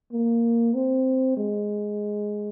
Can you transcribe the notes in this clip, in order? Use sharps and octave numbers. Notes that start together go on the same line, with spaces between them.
A#3
C4
G#3